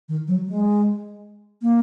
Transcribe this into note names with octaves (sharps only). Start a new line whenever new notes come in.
D#3
F#3
G#3
A#3